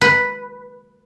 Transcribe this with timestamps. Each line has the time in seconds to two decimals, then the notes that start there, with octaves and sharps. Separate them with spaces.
0.01 B4